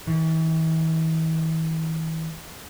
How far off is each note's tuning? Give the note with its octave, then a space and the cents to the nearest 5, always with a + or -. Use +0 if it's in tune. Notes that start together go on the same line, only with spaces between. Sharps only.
E3 -40